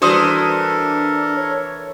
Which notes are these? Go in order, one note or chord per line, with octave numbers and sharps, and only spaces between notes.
E3 D4 F#4 A4 A#4 C5 D#6
C#5